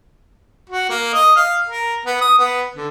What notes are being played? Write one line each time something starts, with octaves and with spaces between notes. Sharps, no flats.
F#4
A#3
D#5
F5
A#4
B3
D#6
B3
D3